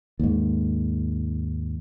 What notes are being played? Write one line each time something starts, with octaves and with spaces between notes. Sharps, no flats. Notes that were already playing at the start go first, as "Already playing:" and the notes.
D#2 G#2